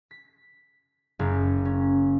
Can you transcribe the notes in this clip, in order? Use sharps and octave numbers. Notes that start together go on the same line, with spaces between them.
B6
F#1
C#4